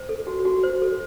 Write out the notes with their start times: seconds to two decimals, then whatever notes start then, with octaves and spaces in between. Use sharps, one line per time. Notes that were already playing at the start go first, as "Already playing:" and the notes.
Already playing: C5
0.09 A4
0.27 F#4
0.45 F#4
0.63 C5
0.82 A4